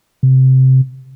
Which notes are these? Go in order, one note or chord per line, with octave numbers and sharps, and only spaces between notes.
C3